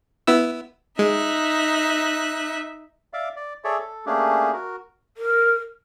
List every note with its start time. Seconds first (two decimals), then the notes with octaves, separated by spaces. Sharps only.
0.27 B3 E4 E6
0.99 G#3 D#4 E5 F#6
3.13 D5 E5 F5 D6
3.36 D5
3.64 G#4 A4 C#5 D5 E5
3.79 A4
4.06 A3 A#3 C#4 D4 G4 G#4
4.53 F#4 A#4
5.17 A#4